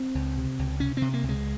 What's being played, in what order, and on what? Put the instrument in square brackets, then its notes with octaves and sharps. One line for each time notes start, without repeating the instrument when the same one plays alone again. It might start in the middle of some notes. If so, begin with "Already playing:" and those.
Already playing: [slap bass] C4
C#2
C3
C#2
C3 C#4
C3 C4
A#3
C#2
G#3